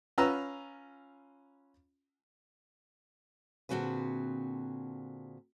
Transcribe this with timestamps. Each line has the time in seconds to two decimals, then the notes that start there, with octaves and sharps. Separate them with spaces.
0.18 C#4 F4 B4 A#5 E6
3.69 A#2 D3 C4 F#4 G#4 B4